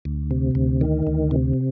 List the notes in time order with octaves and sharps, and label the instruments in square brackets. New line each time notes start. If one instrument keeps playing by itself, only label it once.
[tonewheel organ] D2
C3
D2
D#3
D2
C3